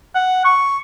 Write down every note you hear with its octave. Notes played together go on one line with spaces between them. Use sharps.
F#5
C#6